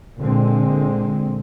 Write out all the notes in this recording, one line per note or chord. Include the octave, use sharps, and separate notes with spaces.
A#2 D3 G#3 C4